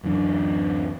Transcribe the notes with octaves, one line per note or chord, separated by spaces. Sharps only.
D1 F#2 E3 D4